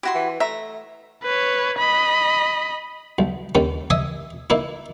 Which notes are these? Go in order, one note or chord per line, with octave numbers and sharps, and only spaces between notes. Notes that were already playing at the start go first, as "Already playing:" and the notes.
E4 F#4 G4 C6
E3
A3 E5 A#5
B4 C#5
D#5 B5
B1
D#2 D#3 C#4
D#5 E5 G#5 D#6
A#3 D#4 E4